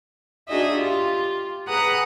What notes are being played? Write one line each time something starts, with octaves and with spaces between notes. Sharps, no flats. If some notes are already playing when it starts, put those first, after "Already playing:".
D4 D#4 F#4 G#4 D#5 E5
F4 G4
G#4 B4 F#5 A#5 D#6 F#6